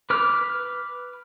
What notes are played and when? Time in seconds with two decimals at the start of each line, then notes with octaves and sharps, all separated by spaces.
0.10 B4 D6 F6